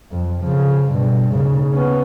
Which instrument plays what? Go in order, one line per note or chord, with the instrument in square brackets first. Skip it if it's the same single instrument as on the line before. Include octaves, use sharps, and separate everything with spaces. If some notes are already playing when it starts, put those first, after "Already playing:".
[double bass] F2
C#3 F3
G2 B2
D#2 C#3
B3 C#4